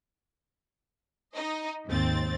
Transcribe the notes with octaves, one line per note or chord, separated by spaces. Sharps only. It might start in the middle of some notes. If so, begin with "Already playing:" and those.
D#4 D#5
D#2 G#2 C4 A6